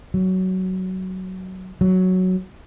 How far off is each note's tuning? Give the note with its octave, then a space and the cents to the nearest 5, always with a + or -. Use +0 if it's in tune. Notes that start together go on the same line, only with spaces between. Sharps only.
F#3 +10
F#3 +0